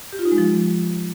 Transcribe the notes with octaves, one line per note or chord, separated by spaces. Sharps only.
G4
F4
D#4
G#3
F3